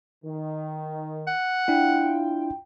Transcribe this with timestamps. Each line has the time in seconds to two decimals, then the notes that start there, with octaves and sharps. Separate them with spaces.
0.25 D#3
1.27 F#5
1.68 D4 E4 F4 G5